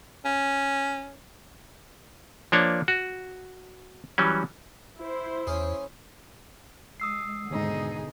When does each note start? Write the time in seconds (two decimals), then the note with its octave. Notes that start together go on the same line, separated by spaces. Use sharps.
0.25 C#4
2.52 F3 A#3 D4 C#5
2.88 F#4
4.18 E3 F#3 G3 C#4
4.98 E4 C5
5.47 E2 C#4 G#4
7.00 G#3 D#6 E6 C7
7.51 D#2 G#2 B2 D3 D#4 G#4